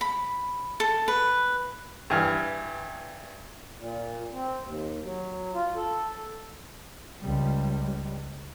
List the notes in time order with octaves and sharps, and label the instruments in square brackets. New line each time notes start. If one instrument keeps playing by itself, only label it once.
[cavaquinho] B5
A4
B4
[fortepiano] G2 E3 F6
[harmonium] A#2
C4
D#2
F#3
F4
A4
[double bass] C#2 G3